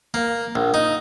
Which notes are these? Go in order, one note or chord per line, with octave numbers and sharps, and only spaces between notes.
A#3
A#1
D#4